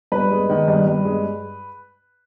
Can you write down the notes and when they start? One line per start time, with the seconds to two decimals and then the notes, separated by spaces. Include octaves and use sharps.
0.12 G2 B4
0.31 G#3
0.49 D#3
0.68 G2
0.87 G2
1.05 G#3